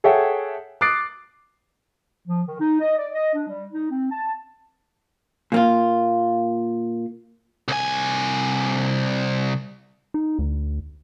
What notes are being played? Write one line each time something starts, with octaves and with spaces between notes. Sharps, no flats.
G#4 A4 C#5 E5 F#5 G5
D6 D#6 F#6 A6 C7 D7
F3
D#3
D#4
D#5
D5
D#5
D4
G3
D#4
C4
A5
A#2 A#3 F4
C2 G#5
D#4
D2